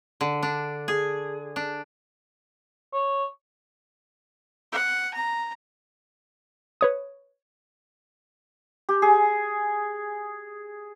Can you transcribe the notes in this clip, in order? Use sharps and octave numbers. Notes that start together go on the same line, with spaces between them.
D3
D4
G#4
D4
C#5
F#5
A#5
B4 C#5 D#6
G4
G#4